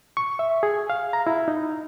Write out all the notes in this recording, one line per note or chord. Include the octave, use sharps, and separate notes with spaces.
C#6
E5
G#4
F5
A#5
E4
D#4